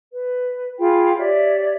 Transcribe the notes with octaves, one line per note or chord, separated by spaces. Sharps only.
B4
F4 G#4 G5 B5
G4 C#5 D5 E5